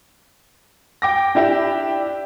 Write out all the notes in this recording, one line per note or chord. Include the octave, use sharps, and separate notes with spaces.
G5 D6 A#6
D4 E4 G4